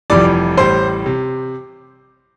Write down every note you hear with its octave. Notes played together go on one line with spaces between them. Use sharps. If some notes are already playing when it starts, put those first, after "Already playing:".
F1 F2 E3 G3 D5 D6
A1 A2 G3 C5 C6
C3